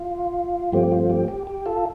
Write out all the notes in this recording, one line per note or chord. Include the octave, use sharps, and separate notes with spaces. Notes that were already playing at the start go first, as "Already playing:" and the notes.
Already playing: F4
G2 F3 A3 C4 G4
F4
G4
G4
G4
F4 A4